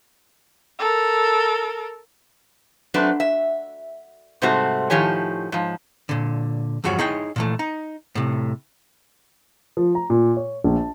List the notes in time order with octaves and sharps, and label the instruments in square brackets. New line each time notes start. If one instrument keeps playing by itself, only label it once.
[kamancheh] A4 A#4
[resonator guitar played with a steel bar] F#3 A3 C4 D4 B4
E5
G#2 C3 G3 A3 C4 F#4
A2 D#3 F3 G4 C#5 G#5
G#2 F3
[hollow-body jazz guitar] A#2 D3
E2 G2 F3 F#4 C#5
D#4 E4 G#4 C#5 G5
A#2 E3 A3
D#4
A2 C3
[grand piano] F3
A#5
A#2
C#5
A#1
A5